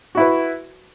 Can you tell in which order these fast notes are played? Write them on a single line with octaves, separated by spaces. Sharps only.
F#4 E4 B4